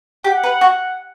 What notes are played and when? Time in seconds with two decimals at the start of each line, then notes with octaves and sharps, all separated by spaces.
0.24 G4 F#5
0.43 B4
0.61 F#4